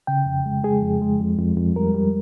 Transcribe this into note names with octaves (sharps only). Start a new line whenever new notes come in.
C#3 G5
F2
G#3
G#3 G#4
F2
G#3
F2
F2
F2
G3 A#4
G3